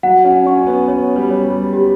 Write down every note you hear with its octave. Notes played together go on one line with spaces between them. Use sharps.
F#3 F#5
C#4
C#4 C#6
C#4
B3
B3 C#5
G3
C#5
G3
G4